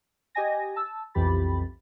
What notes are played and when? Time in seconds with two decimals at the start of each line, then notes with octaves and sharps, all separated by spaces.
0.35 G4 D#5 G#5 A#6
0.76 A5 E6
1.14 B1 F2 E3 G4 B5 A6